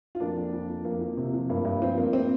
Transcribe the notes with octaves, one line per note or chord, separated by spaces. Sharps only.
F4
F2 A#3 D4
F2
F2
F2
F2 A#3
F3
C3
F3
G2 A#3
G2
F3 C4
A#3
C4